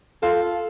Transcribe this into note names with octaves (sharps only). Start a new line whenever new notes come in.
F4 A4